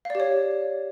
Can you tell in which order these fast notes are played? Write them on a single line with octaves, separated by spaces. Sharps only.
F5 D5 G4 C#5